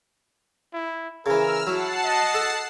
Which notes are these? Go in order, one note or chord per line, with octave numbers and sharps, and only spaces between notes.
E4
C#3 E3 A#4 E6 F6
F#3 E4 F#5 A5 C7
D#5
A4